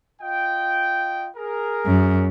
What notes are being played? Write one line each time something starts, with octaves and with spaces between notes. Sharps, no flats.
F4 D#5 G5
G#4 A#4
F#2